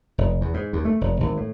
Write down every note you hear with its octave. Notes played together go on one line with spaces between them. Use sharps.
F1
E2
G#2
D#2
A3
F1
G#1
A2